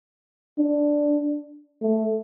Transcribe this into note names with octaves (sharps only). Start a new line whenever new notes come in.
D4
A3